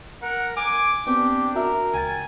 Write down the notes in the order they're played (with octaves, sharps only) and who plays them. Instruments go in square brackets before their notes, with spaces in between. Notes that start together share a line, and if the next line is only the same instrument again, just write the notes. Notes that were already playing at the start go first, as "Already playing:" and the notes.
[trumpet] A#4 [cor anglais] F#5
[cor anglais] G#5 [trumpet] D6
[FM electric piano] B3 C4 [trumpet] D4 [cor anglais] G4
[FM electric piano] F#4 E5 [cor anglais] A#4
[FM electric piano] C#2 G5 A6 [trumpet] G#5